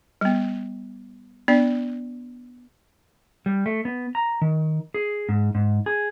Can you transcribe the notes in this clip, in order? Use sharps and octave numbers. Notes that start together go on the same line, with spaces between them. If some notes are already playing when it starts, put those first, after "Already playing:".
G3 B3
B3 D4 D5
G3
A3
B3
A#5
D#3
G#4
G#2
G#2
G#4